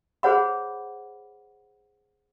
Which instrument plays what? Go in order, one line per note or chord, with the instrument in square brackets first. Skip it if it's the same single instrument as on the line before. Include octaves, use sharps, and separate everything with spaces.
[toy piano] G#4 C5 C#5 F#5 B5